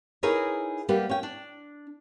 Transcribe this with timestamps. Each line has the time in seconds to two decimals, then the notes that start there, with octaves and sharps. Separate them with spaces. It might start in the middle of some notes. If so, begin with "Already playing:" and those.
0.23 D#4 E4 G#4 A#4 B4 C#5
0.89 G3 A#3 B3 G4 B4
1.09 C#4 G5
1.23 D4